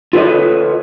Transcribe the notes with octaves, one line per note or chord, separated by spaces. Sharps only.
F4 A4 B4 C#5 D#5